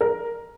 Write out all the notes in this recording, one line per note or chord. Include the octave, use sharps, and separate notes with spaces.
A#4